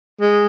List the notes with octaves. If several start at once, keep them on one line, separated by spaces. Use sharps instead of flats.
G#3